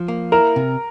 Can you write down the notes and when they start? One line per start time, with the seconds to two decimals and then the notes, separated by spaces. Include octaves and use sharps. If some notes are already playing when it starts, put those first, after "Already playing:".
Already playing: F3
0.08 A#3
0.32 E4 A#4
0.56 C3